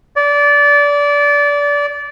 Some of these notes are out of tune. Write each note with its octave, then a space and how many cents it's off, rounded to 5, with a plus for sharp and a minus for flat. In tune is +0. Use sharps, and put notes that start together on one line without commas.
D5 -25